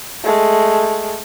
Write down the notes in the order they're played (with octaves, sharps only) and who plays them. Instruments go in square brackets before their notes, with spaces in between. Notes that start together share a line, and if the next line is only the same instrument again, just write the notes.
[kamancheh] G#3 A3